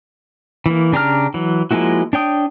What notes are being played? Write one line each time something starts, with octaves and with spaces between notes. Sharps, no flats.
E3 A#3
C#3 D4 G4 A#5 F6
E3 F#3
F3 G#3 A#3 E4 F#4
D4 C#5 G5 D#6